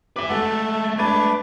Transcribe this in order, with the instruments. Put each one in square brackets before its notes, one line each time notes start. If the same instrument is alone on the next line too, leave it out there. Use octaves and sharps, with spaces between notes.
[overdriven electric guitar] B4 E5 [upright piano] D6 B6
[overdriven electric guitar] G#3 A3 [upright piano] A4 F#5 [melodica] E5 A5
[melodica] D4 B4 D6 [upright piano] G#6 A6 D#7